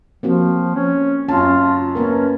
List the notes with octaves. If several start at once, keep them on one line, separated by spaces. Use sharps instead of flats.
F3 A#3 C4 F#4
C#4
F#2 C#4 F4 A5
A#3 B3 C#4 A#4